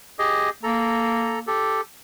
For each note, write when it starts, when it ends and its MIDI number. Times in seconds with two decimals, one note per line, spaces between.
0.19 0.50 67
0.19 0.50 68
0.19 0.50 75
0.63 1.52 58
0.63 1.39 69
0.63 1.39 82
1.47 1.81 67
1.47 1.81 69